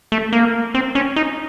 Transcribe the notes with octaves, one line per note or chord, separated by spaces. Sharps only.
A3
A#3
C4
C#4
D#4